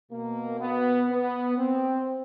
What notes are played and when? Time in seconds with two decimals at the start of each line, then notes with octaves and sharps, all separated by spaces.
0.11 B2 A#3
0.60 B3
1.09 B3
1.57 C4